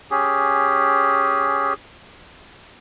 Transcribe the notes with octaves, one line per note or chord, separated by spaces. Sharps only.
C#4 G4 G#4